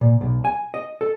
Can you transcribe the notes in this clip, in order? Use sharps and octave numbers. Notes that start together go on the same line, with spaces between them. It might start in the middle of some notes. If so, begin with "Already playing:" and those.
A#2
B1
G#5
D#5
A4